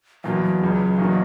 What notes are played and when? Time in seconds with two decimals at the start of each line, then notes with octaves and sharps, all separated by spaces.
0.24 E2 B2 F#3 A#3
0.43 F#3
0.61 C#2 C#3 G#3
0.98 E2 B2 A#3 D#4 F#4